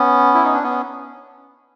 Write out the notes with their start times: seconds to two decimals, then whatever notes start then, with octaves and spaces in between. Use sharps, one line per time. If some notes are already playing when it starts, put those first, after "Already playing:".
Already playing: B3 C#4
0.34 E4
0.44 D#4
0.54 D4
0.63 B3 C#4